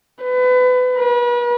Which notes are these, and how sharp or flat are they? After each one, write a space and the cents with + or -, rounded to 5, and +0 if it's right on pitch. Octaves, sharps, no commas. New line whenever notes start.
B4 +30
B4 -40